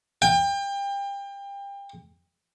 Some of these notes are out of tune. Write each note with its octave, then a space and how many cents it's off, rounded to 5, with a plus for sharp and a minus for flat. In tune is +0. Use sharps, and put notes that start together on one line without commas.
G5 +30